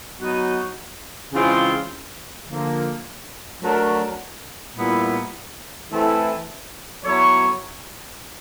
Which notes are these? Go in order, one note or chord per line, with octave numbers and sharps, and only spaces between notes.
F#3 B3 D#4 F#4
C#3 E3 G#3 C4 F4
D3 F3 A#3
F#3 A3 D4 F#4 A#4
A#2 G3 B3 E4
E3 A3 C4 E4 A4
F#3 B3 E4 A4 C#5